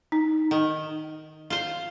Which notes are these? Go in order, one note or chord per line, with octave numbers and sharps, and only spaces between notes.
D#4
D#3
F4 C5